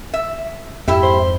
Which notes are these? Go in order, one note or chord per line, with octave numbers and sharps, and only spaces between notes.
E5
F2 G#2 E4 G4 E5
C5